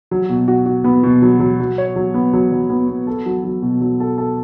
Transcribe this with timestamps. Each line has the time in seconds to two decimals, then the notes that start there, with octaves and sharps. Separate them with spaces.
0.11 F#3
0.29 B2
0.48 F#4
0.66 F#4
0.84 B3
1.03 B2
1.22 F#3
1.40 F#3
1.60 F#3
1.78 C#5
1.96 F#3
2.14 B3
2.33 F#3
2.52 F#3
2.70 B3
2.89 B3
3.07 A4
3.26 F#3
3.44 F#3
3.62 B2
3.81 F#3
4.00 A4
4.18 A4